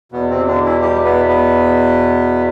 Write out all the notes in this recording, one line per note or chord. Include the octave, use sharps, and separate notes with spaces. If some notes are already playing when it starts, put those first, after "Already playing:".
E2 B2 B3
C3 C4
D3 D4
E3 E4
G3 G4
B3 B4
B3 B4